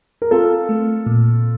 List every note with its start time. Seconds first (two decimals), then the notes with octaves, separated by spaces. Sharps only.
0.22 A#4
0.31 C4 F4 A4
0.69 A3
1.06 A#2